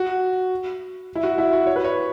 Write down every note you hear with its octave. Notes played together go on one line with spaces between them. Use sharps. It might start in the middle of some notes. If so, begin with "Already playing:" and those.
Already playing: F#4
E4
F#4
E4
F#4
C#5
B4
C#5